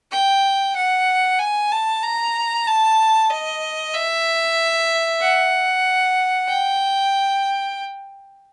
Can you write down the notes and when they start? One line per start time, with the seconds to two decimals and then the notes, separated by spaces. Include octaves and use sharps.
0.12 G5
0.76 F#5
1.39 G#5
1.72 A5
2.03 A#5
2.67 A5
3.30 D#5
3.95 E5
5.21 F#5
6.49 G5